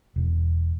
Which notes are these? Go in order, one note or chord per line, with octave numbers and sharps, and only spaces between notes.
E1